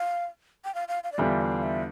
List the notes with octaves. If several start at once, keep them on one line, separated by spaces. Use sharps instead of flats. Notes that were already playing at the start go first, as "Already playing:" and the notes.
Already playing: F5
G5
F5
F5
F5
D5
E2 D3 G3 D4 F4 E5
F5
E5